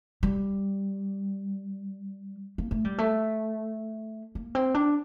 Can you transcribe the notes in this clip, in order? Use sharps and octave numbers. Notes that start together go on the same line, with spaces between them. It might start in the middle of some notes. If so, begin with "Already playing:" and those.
G3
A#3
A3
G3
A3
A#3
C4
D4